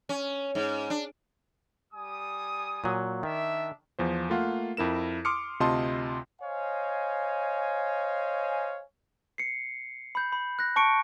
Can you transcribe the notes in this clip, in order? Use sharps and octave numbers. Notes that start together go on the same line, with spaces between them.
C#4
G#2
D4
G3 G#5 D#6
A#2 F#3
D#3 D4 E5
E2 F3 C5
A3 A#3 F4 F5 F#5
F2 E4 A#4 E7
C6 D6 D#6 F6 C#7
D2 C3 F4 D#5 A5 C6
C5 C#5 D#5 F5 G#5
C7 C#7
B5 G6
B5
F#6 A#6
A5 C#6 C#7 D7